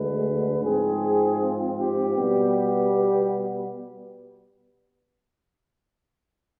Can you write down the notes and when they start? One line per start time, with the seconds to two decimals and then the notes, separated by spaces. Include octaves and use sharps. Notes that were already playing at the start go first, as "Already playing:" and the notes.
Already playing: D2 D3 G#3 B4
0.61 G#2 F3 C4 G#4
1.38 F4
1.77 G4
2.15 B2 G3 B3
2.54 G4